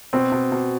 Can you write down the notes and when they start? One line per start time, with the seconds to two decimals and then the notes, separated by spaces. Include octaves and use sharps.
0.13 B2 C4
0.32 B2
0.52 B2